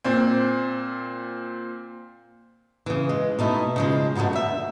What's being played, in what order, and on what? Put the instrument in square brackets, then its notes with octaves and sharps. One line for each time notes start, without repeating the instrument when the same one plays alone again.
[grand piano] A#2 C4
[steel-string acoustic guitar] C#3 E3
G#3
B2 A3 D#4 E4
C#3 F3 G#3
G#2 B2 D3 F#3 A3
D2 E5